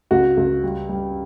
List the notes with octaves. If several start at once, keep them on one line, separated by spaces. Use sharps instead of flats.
C#2 F#4
C#2
G3
G3